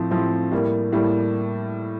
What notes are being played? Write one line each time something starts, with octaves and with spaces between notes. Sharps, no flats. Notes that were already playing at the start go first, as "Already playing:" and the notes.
Already playing: A2 F3 C4
A2 F3 C4
A2 G3 A#3
A2 G3 A#3